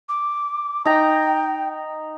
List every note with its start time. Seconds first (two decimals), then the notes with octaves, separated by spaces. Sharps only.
0.09 D6
0.85 D#4 G5 A#5